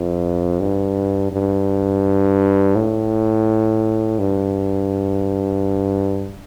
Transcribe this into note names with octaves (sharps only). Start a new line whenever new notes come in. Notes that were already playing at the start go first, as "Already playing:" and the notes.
Already playing: F2
G2
G2
A2
G2